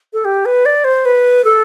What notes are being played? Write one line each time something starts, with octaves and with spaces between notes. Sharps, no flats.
A4
G4
B4
D5
C5
B4
A4